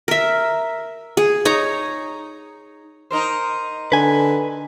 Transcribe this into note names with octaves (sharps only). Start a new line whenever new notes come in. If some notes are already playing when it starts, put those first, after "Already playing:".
A#4 E5
G#4
D#4 C#5 A#5
D#4 A#4 C5
D3 B4 G#5